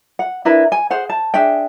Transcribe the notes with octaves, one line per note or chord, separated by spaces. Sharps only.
F#5
D4 E4 A#4 B4
G#5
G#4 C5 F#5
A5
D4 G#4 E5 G5